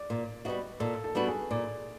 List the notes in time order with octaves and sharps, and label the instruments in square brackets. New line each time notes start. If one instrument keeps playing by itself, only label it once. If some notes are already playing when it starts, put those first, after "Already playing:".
Already playing: [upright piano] D5
[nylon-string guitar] A#2
[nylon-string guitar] G3 B3 D4 F#4 [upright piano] D#5
[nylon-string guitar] A#2 [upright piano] A4
[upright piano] A4
[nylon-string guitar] G3 B3 D4 F#4
[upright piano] G#4
[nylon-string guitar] A#2 [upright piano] D5